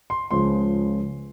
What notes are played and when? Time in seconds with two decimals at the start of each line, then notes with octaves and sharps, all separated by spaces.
0.10 C6
0.31 C#2 C#3 F3 G#3 C6